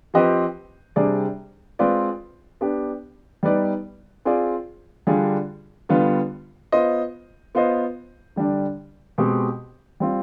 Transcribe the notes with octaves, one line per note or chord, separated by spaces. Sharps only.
F3 C4 G4 B4 D#5
C3 G3 D4 G#4 D5
G#3 C4 F4 B4 D5
B3 D4 G4
G3 B3 D#4 B4 D5
C4 F4 G#4 D5
D3 G3 D4 F4 G#4
D3 G3 B3 F4
B3 F4 C5 D#5
B3 F4 C5 D#5
D3 G3 D4
B2 G#3 C4 G4
G3 C4 F4